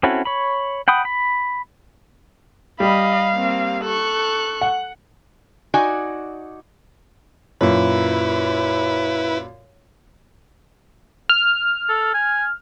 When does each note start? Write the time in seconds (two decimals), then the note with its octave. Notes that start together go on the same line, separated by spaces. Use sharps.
0.03 C4 C#4 E4 F#4 A4
0.25 C#5 B5
0.88 F#5 G5 B5 D#6
1.05 B5
2.80 G3 D#5 F5 B5
3.34 A#3 C4
3.84 A4 C#6 F#6
4.61 F#5
5.74 D#4 F#4 D5 G#5
7.61 F#2 A#2 E4 B4
11.29 F6
11.89 A4
12.14 G#5